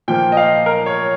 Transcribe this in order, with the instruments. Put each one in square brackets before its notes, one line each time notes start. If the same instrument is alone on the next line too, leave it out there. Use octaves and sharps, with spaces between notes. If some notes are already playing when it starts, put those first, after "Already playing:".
[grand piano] A#2 F3 A#3 G5
D#5
F5
A#4
C#5